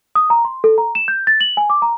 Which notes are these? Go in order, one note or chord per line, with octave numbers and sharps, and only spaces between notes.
D#6
A#5
C6
A4
A#5
E7
G6
A6
F#7
G#5
D6
A#5